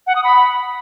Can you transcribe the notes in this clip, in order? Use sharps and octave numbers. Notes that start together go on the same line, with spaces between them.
F#5
D#6
B5